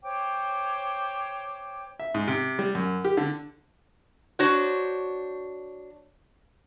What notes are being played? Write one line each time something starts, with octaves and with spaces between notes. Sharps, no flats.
C5 C#5 G5 D6
E5
G#2
C3
G3
F#2
G4
D3
D4 F#4 C5 C#5